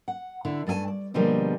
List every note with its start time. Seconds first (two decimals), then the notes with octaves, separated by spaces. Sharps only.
0.08 F#5
0.45 D3 E4
0.67 G2 A3 G#4 G#5 A5
0.88 D5
1.14 B2 D3 F3 G3 A#3 G#4